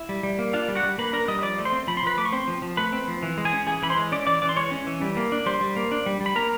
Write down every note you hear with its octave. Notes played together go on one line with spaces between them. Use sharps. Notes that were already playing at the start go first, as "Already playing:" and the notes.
Already playing: E4 E5
G3
G3
A#3
D4 F4 F5
G3
F#4 F#5
G3
A#3 B4 B5
D4 A#4 A#5
G3 D#5 D#6
D#6
F3 D5 D6
A3
C5 C6
C4
F3 B5
C6
F3 B4 B5
A3 D6
C#6
C4 C5 C6
F3
F3
A3 B4 B5
C4
F3
E3
G#3
G#4 G#5
C#4
E3 G#4 G#5
E3 B5
C5 C6
G#3
C#4 D5 D6
E3 D5 D6
E3 D5 D6
C6
G#3 C#5 C#6
C#4
E3
G3
A#3
D4
G3 C5 C6
G3
A#3
D4
G3
G3
B5
A#3 A#4 A#5